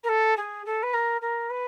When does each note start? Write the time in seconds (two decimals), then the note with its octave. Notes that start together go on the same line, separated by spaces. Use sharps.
0.03 A#4
0.08 A4
0.37 G#4
0.65 A4
0.82 B4
0.93 A#4
1.21 A#4
1.49 B4